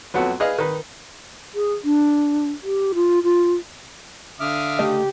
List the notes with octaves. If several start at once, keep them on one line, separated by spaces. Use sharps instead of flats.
F2 F#3 B3 F#4 A4
G#4 B4 D#5 F5
D#3 B4
G#4
D4
G4
F4
F4
D3 E5 F5 D6 D#6 F6
C#3 A3 G4 D#5